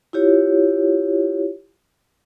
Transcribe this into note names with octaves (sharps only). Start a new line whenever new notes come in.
E4 F4 G4 C#5